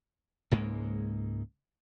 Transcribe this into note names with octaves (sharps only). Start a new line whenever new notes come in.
C#2 G#2 G#3 A#3